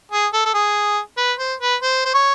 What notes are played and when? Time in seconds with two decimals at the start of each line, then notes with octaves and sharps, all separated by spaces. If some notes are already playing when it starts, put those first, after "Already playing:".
0.11 G#4
0.33 A4
0.45 A4
0.54 G#4
1.17 B4
1.39 C5
1.60 B4
1.82 C5
2.05 C5
2.13 C#5